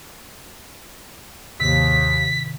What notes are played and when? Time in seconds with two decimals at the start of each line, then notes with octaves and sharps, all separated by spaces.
1.60 D#2 G#2 C3 D#3 B6